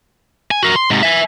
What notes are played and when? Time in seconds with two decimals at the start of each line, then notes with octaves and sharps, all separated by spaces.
0.51 G#5
0.63 F#4 A#4
0.76 C6
0.91 G#2 C3
1.03 E5 G#5